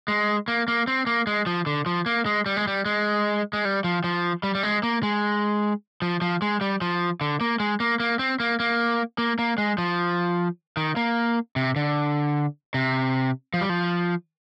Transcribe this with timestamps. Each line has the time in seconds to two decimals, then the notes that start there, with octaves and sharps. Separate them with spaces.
0.08 G#3
0.48 A#3
0.68 A#3
0.87 C4
1.07 A#3
1.27 G#3
1.46 F3
1.66 D3
1.86 F3
2.06 A#3
2.26 G#3
2.46 G3
2.57 G#3
2.67 G3
2.86 G#3
3.53 G#3
3.65 G3
3.84 F3
4.04 F3
4.43 G3
4.55 G3
4.63 G#3
4.83 A#3
5.03 G#3
6.02 F3
6.21 F3
6.42 G#3
6.61 G3
6.81 F3
7.21 D3
7.41 A#3
7.60 G#3
7.80 A#3
8.00 A#3
8.19 C4
8.40 A#3
8.60 A#3
9.18 A#3
9.39 A#3
9.58 G#3
9.78 F3
10.77 D#3
10.96 A#3
11.56 C3
11.76 D3
12.74 C3
13.54 F3
13.61 G3
13.69 F3